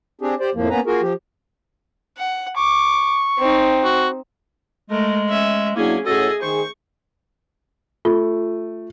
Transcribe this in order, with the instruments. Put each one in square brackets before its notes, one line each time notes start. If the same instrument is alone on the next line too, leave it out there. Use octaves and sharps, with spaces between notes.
[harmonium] C4 D4 G4 G#4
G4 C5 D5
F2 A2 F3 A#3
A#3 B3 C#4 B4 A#5
A#3 F4 F#4 G#4 A#4
F3 G4
[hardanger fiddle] F#5
[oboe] C#6 [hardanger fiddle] D6
[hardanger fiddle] C4 D#4
[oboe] F#4
[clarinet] G#3 [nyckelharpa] A3 A#4
[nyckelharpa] C#4 E5
[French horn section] F#3 D4 E4 [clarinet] A#3 [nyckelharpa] C#4 G#4
[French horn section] A2 C#4 F#4 [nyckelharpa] G#4 D#5 [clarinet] A4
[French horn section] D#3 G#4 [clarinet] C5 [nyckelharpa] C#6
[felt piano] A3 [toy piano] F4